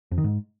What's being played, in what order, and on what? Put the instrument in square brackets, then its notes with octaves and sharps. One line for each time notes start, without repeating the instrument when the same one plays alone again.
[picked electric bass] F2
D#3
G#2